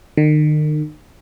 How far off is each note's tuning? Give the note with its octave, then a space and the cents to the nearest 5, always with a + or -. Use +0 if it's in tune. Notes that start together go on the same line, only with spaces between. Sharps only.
D#3 -40